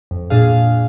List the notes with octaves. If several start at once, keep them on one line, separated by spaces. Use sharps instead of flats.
F2
A#2 D4 G#4 F5